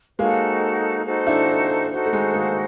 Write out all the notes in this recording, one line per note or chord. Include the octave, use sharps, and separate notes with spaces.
G#3 A#3 D#4 F#4 A4 C5
D#4 F#4 A4 C5
D4 E4
D#4 F#4 A4 C5
A3
G#3
G#3 A#3